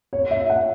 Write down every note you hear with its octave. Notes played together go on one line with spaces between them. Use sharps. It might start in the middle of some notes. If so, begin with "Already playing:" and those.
C#5
E5
F#5